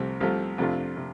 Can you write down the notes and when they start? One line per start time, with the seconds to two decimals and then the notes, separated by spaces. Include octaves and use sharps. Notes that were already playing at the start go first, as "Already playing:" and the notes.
Already playing: C2 C3 F3 A3
0.20 C2 C3 F3 A3
0.58 F2 C3 A3 D4 F4
0.97 C3